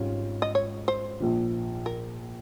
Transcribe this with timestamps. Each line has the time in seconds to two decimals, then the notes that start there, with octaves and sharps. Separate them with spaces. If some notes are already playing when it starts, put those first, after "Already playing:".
Already playing: G#1 G#2 G3 C#4 F4
0.42 D#5
0.55 C#5
0.88 C5
1.20 A#1 A#2 F3
1.86 A#4